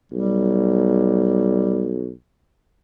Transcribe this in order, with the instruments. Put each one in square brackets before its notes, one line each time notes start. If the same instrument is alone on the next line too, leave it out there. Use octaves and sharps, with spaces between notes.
[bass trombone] B1 [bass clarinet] G3